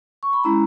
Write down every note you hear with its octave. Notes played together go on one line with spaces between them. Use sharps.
C#6
B5
G#3 C#4 E4 A#5